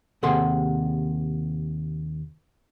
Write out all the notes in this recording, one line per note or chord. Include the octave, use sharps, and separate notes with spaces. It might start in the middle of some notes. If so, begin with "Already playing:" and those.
D#2 C3 G#4 A4 F#5 C6